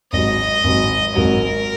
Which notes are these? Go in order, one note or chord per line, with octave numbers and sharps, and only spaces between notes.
G#1 G#2 F#3 D#5
G#1 G#2 F#3
G#1 G#2 F#3 A#4